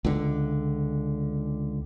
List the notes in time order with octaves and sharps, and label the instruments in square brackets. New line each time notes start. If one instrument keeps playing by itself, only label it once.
[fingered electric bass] C#2 D3